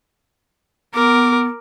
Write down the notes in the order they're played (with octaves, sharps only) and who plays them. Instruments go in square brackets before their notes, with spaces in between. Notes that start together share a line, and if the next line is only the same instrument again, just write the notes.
[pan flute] B3 [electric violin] A#4 D6